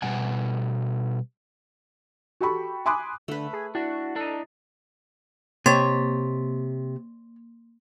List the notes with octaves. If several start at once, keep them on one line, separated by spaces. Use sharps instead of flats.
B2 G3 F#5 G#5
F#4 G4 A4 G5 B5 C#6
G#5 B5 C6 D6 D#6 F#6
D3 A3 B4
G#4
D4 E4 F#4
D4 D#4 A4
C3 A#3 G4 C#5 C6 A6